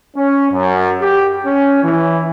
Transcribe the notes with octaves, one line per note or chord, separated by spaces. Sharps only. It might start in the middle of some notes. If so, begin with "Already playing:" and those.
C#4
F#2
G4
C#4
E3